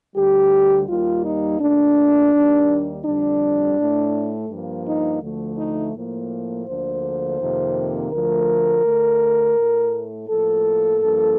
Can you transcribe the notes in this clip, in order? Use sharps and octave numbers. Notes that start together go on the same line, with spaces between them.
D2 D3 G3 G4
D#2 D#3 G3 A#3 F4
D#4
A#2 A3 D4
D#2 D#3 G3 A#3
F2 D3 G3 D4
A2 A3
G2 F3 A#3
D#4
D2 D3 F3 A3
D#4
A2 F3 A#3
D2 D3 F3 A#3 C5
F2 C3 D#3 A#3
D2 D3 F3 A3 A#4
D2 D3 A3
A2 A3
A2 F3 A#3 A4
G2 F3 A#3